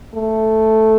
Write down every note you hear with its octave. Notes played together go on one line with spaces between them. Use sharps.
A3